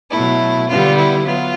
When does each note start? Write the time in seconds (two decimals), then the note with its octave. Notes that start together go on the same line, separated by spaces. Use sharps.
0.11 B2 F#3 A3 E4
0.68 D3 G3 B3 F4
0.97 E4
1.25 F#3 B3 F4